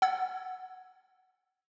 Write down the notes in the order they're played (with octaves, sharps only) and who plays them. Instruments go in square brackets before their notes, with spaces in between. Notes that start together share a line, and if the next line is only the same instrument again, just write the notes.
[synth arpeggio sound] F#5 E6 G#6